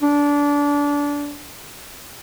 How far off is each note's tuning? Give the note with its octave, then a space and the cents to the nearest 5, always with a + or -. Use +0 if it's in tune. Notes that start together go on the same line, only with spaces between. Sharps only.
D4 -25